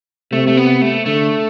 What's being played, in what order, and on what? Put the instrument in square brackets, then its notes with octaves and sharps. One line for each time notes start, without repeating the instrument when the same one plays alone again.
[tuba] C3 [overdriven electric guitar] A3
[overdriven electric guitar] A3
B3
A3
[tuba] D3 [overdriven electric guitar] A3